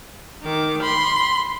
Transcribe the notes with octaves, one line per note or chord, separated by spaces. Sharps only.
D#3 D6
B5 C6